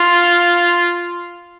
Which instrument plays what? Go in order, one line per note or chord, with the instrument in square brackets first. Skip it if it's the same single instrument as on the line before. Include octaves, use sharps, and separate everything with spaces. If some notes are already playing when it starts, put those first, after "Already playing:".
Already playing: [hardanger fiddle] F4